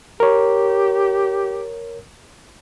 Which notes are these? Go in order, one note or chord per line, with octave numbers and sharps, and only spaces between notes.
G4 A#4 C#5